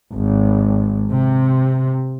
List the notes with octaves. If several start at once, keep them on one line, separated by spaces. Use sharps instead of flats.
G#1
C3